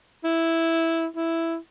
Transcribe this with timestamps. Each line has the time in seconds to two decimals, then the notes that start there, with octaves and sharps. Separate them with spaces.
0.24 E4
1.16 E4